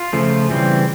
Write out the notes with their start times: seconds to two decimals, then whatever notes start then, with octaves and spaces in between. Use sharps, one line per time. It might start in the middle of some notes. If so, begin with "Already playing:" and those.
Already playing: F4
0.13 C#3 F3 A3
0.50 C#3 E3 G3 C4